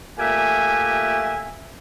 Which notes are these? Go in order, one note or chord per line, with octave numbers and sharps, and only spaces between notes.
A#2 A3 G4 E5 G#5